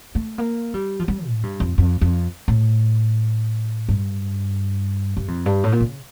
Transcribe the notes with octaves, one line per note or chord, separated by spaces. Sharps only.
A3
A#3
G3
F3
G3
A2
G2
F2
F2
F2
A2
G2
G2
F2
G2
A2
A#2
C#3